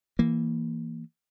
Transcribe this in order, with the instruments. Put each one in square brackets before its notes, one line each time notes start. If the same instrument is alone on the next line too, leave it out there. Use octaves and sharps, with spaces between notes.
[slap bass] E3 A#3